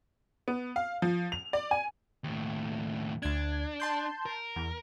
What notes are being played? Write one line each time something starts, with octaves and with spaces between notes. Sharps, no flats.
B3
F5
F3
F7
D5
G#5
D#2 A2
D2 D4 G#6
A5 C6 G6
A#4
E2